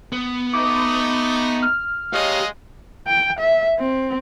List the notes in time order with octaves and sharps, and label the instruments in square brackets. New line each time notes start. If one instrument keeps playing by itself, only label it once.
[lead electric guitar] B3
[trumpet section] A3 D#4 [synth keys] D6
[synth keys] F6
[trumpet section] G#3 D#5 F5 [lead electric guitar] G4 C#5
[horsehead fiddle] G5
E5
C4